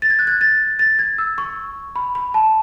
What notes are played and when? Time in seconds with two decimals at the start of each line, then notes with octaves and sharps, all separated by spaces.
0.02 A6
0.10 G#6
0.19 F#6
0.27 G#6
0.41 A6
0.79 A6
0.99 G#6
1.18 E6
1.38 C#6
1.96 B5
2.15 B5
2.34 A5